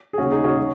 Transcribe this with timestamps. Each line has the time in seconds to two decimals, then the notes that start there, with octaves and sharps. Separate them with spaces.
0.13 G#4
0.18 D#2 C#3 C#4 F#4
0.32 D#4 G#4
0.44 C#4 F#4
0.57 C#3